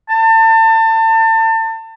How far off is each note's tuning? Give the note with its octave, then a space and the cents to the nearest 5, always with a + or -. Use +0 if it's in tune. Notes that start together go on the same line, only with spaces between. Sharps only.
A5 +30